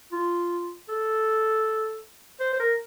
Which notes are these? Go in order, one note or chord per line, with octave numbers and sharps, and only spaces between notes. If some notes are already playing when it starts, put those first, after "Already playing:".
F4
A4
C5
C5
A#4